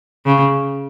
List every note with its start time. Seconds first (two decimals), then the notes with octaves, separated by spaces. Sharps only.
0.26 C#3